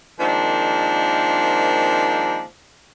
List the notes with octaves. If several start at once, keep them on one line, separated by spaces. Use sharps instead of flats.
D#3 F3 G#3 A#3 C4 D4